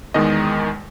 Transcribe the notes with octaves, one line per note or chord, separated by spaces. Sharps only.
E2 D#3 G#3 D#5